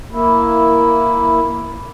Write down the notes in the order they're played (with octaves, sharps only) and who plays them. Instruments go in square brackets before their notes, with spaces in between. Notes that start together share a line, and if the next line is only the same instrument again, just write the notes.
[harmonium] A#3 E4